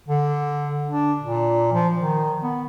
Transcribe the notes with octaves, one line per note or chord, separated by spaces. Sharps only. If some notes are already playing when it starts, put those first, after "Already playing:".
D3
D4
A#2
F3
D#3
B3